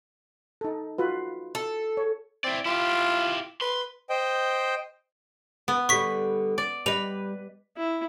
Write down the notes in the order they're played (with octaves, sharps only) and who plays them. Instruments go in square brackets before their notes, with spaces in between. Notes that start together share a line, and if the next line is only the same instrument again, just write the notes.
[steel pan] D#4 A4
F4 F#4 B4
[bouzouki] A4
[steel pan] C#5
[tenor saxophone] C4 [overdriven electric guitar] E4 D5
[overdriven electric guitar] E4 G4 [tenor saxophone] F4
[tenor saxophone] B4 [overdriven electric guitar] C6
[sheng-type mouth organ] C5 D#5 G5
[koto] B3
[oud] D3 G3 [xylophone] C#6 B6
[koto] D5
[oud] G3 [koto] B4 [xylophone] D#5 F7
[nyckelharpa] E4